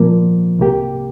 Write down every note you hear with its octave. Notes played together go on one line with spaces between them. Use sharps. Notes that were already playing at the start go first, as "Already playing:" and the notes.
Already playing: A#2 F3 A#3
C2 C3 A#3 G4